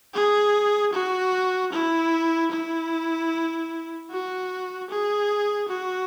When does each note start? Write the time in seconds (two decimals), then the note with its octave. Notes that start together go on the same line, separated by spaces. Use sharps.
0.14 G#4
0.93 F#4
1.73 E4
2.51 E4
4.11 F#4
4.90 G#4
5.69 F#4